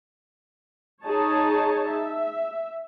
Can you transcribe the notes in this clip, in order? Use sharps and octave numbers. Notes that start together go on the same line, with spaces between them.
D#4 G#4 C#5 A5
E5